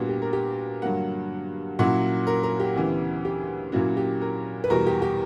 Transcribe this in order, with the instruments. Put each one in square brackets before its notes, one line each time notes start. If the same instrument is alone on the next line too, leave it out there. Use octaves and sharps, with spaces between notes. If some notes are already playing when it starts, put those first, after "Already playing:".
Already playing: [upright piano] A#2 G3 B3 D4 F#4
G4
A#4
G4
G2 D3 F#3 A#3 F#5
A#2 F#3 C#4 E4 F#5
A#4
A#4
G4
D2 C#3 E3 B3 E4
G4
A#2 F#3 A#3 C#4 E4 F#4
G4
A#4
B4
E2 B2 G3 A#4
G4
G4